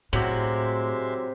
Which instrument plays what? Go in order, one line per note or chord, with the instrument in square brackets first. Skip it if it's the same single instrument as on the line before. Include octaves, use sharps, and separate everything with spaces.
[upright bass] A2 [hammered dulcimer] C3 G4 [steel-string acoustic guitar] F#3 E4 [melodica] G#3 E5 C6